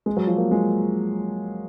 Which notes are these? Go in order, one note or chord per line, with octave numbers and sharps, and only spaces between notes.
G#3
F#3
F3
A#3
G#3